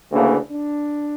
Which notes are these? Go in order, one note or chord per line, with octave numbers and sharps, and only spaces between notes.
D2 C#3 E3 A#3 D4
D4